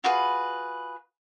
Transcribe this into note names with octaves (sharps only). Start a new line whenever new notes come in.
F4 F#4 G#4 B4